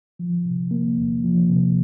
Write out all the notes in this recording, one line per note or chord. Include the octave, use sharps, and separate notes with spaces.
F3
C3
A#3
E2
F3
C3